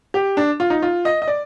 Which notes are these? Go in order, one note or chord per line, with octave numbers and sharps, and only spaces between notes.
G4
D4
F4
D#4
F4
D#5
D#5
D5